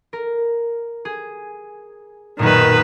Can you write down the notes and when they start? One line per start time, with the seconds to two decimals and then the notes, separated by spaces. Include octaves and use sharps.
0.13 A#4
1.05 G#4
2.39 B1 F#2 A#2 D#3 B4